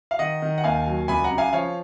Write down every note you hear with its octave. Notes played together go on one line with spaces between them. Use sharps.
F5
D#3 D#5 F#5
D#3
F#5
D#2 F5 G#5
F#3
C#2 G#5 B5
F#5 A#5
C#3
F5 G#5
F3 C#5 F5